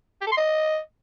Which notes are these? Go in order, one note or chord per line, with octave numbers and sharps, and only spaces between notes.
G4
A4
C6
D#5